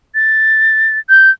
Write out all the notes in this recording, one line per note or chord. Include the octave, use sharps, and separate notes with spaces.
A6
G6